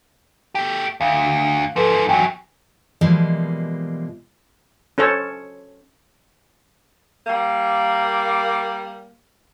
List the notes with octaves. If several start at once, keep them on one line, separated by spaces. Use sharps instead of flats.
A3 G4
D2 F5
G#2 F3 A4 B4
E2 F#3 G5 G#5
B2 E3 F3 G3 G#3 A#3
C#4 A4 C5 C#5
G3 A#3